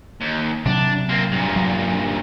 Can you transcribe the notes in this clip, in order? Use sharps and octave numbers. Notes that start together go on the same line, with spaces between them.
D#2
C3 F#3 D4
A#3 C4
G2 A#2
F#3